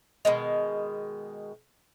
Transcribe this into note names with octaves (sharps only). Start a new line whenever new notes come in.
B2 D#3 G#3